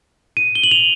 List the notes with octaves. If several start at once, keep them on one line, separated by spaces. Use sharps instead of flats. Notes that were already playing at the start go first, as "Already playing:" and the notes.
D#7
G7
F#7
F7